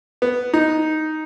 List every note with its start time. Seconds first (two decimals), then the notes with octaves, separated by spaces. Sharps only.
0.22 B3
0.54 D#4